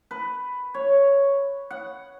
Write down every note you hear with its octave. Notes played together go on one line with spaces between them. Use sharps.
B4
C#5
F#5